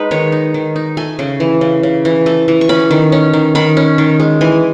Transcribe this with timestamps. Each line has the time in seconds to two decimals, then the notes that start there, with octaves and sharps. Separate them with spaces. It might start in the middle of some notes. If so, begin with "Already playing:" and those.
Already playing: G#3 D#4 B4
0.11 D#3 C#5
0.32 D#4
0.54 D#3
0.76 D#4
0.97 A3 G#5
1.19 C#3
1.40 E3
1.61 C#3
1.83 C#3
2.05 E3
2.26 A3
2.48 E3
2.61 C#6
2.69 C#4 B5
2.91 D#3
3.12 C#4
3.33 D#3
3.55 D#3 B5
3.77 C#4
3.98 D#3
4.20 G#3
4.41 E3 G#5